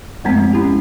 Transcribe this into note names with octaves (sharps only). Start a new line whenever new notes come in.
F#2 F3 G#3 A3 B3 C4
C#4 E4 G4